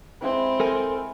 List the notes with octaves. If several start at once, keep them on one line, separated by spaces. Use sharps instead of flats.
G#3 C4 E4
A4 A#4 G#5